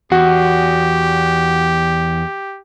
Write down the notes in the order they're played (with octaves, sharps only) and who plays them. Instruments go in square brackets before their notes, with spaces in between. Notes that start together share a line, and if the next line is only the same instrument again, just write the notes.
[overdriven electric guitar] E2 [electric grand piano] F#4 [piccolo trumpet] G4